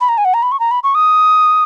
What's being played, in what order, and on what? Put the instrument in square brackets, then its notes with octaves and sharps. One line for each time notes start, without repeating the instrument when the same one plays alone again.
[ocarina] B5
A#5
G#5
F#5
A#5
B5
C#6
A#5
B5
C#6
D#6